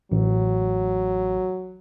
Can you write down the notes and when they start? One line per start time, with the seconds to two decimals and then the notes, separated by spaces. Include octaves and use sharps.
0.12 A1 F#3